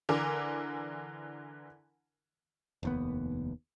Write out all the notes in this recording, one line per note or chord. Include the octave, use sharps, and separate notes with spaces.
D3 E3 A#4 D6
F1 D#2 B3